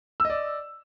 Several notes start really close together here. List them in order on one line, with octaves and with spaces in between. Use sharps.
E6 D#5 D5